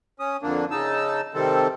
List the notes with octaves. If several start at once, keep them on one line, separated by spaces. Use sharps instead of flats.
C#4 D#6
F2 D3 A#3 D4
C#3 D#4 A5 E6
C3 D#3 G3 C4 A4